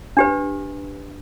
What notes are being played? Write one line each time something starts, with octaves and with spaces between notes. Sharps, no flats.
D4 G4 B4